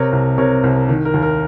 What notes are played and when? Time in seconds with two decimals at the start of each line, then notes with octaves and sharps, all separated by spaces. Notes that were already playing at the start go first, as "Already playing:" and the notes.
Already playing: C3 A#4 C#5
0.12 C2
0.38 C3 A#4 C#5
0.64 C2
0.89 D#3
1.05 A#4
1.14 D#2
1.22 A#4